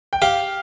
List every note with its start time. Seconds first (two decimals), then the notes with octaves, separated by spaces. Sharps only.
0.13 G5
0.22 G4 F5